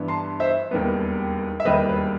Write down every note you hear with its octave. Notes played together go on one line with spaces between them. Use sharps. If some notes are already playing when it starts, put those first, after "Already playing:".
Already playing: G2 E3 B3 E4
A5 C6
C5 E5
E1 D#2 D#3 G3 B3
E5
E1 D#2 D#3 G3 B3 B4 D#5
B4